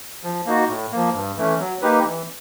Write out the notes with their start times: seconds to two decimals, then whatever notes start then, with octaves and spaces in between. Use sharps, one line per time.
0.23 F3
0.46 A#3 D#4 F#4
0.69 A2
0.92 F3 A#3
1.14 G2
1.37 E3 A3 C#4
1.60 F#3
1.82 A#3 D#4 G4 B4
2.04 E3